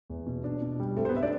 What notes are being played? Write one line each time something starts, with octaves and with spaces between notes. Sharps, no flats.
E2
B2
D4
B2
G3
A3 C4 A4
C5
B3 B4
E5
D4 D5